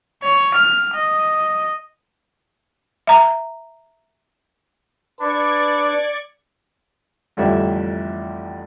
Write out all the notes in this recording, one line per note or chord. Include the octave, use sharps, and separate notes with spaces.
C#5
F6
D#5
E5 A#5
D4 B4 D5 B5 G#6 C#7
A1 F2 D3 G3 C#5 E5